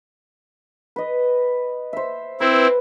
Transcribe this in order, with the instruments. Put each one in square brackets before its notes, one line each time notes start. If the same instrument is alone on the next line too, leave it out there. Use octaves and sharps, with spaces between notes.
[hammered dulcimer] B4 D#5
C5 E5
[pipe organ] C4 E4 [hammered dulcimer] B4